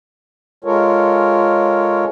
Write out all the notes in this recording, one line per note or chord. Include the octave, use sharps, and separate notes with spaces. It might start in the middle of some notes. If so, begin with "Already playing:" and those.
G#3 F4 A4 A#4 C#5